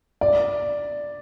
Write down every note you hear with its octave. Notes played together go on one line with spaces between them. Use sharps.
D5